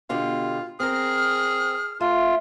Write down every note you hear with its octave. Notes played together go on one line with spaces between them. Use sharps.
B2 D3 F4 G4
C4 G#4 A#4 F6
A3 F4